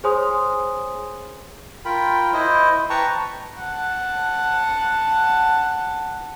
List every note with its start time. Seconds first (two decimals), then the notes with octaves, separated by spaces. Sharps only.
0.04 G#4 C5 C#5 G#5 C6 D#6
1.85 F4 A#4 G5 B5
2.33 E4 C5 D#5
2.90 B4 G5 A5 A#5 C#6
3.58 F#5 A5